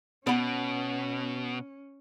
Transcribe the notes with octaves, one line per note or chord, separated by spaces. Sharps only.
B2 B3 C#4 F#5 B5